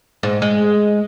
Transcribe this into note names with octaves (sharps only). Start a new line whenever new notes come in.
G#2
G#3